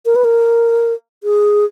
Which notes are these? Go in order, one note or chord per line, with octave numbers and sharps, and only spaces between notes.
A#4
B4
A#4
G#4